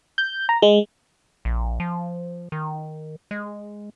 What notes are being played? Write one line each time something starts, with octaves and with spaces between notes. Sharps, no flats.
G6
A#5
G#3
A#1
F3
D#3
G#3